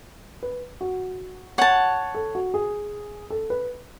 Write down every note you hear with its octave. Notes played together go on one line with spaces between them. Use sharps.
B4
F#4
C#5 F#5 A5
A4
F#4
G#4
A4
B4